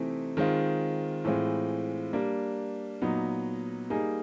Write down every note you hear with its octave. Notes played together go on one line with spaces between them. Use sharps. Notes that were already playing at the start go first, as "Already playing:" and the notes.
Already playing: C3 E3 A3 C4 D#4
D#3 G#3 C4 F4
A2 E3 G#3 C4 F4
G3 A#3 D4
A#2 F#3 B3 D#4
G3 A#3 D#4 G#4